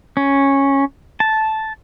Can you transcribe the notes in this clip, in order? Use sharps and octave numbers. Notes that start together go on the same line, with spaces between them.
C#4
A5